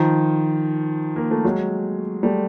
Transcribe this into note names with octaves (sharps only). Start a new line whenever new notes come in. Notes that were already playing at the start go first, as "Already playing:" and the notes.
Already playing: D#3 F3
A#3
A3
F#3 G#3
G3 A3